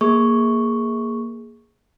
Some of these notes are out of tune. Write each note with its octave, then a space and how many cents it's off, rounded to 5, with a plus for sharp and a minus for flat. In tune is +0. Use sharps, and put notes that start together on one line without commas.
A#3 +0 G#4 +0 C#6 +0